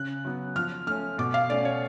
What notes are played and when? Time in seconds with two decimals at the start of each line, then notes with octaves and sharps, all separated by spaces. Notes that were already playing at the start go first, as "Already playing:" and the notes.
Already playing: C#3 F#6
0.25 F#3 B3
0.56 F3 F6
0.87 A3 C#4 F6
1.18 B2 D6
1.34 F5
1.49 A3 C#4 D5
1.65 C#5